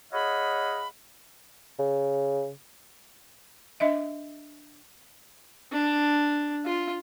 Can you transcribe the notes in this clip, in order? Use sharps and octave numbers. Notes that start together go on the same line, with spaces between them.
G#4 C#5 D#5 F5 F#5 B5
C#3
D4 D#5 E5
D4
F4